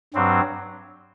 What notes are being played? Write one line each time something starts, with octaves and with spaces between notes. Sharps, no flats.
G2 F#3 C4